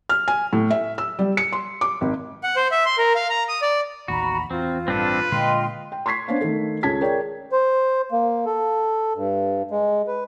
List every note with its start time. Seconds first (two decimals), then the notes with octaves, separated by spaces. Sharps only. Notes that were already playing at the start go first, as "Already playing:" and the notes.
0.09 F6
0.28 G#5
0.53 A2
0.71 E5
0.98 E6
1.19 G3
1.37 C#7
1.53 C6
1.81 D6
2.01 G#1
2.44 F#5
2.56 C5
2.71 E5
2.86 C6
2.98 A#4
3.15 F5
3.30 A#5
3.49 D#6
3.62 D5
4.08 A1 D#2 F#4 A#5 B5
4.51 E2 C4 F4
4.88 A1 G2 C4 D4 A4 B4
5.32 A#2 D3 G#3 F4 D#5 G5 C6
5.92 G5
6.06 C6 C#6 G#6 B6 C7
6.28 B3 C#4 D4 C5 F5
6.41 D#3 A3 A4
6.83 C#2 C#4 A5 G#6 B6
7.00 G#4 A#4 C#5 D5 G5
7.52 C5
8.12 A#3
8.46 A4
9.15 G2
9.71 G#3
10.07 B4